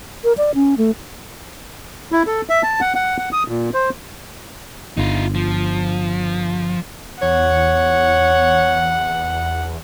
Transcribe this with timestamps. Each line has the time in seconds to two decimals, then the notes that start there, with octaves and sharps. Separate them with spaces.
0.24 A#4
0.38 D5
0.55 C#4
0.78 A3
2.12 E4
2.27 A4
2.49 E5
2.63 A5
2.81 F#5
2.95 F#5
3.18 F#5
3.33 D#6
3.48 A#2
3.74 C5
4.97 G1 D#4 F4
5.35 F3
7.22 E2 C#5 F#5